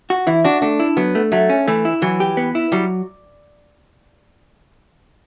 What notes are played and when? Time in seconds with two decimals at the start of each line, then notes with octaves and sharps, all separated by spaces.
0.10 F#4
0.27 E3 E4
0.45 D4 F#4
0.62 A3 D4
0.80 E4
0.97 F#3 B3
1.15 A3
1.32 F#3 A3
1.50 C#4
1.68 E3 A3
1.85 E4
2.02 E3 F#3
2.20 G4
2.37 B3
2.55 E4
2.72 F#3 G3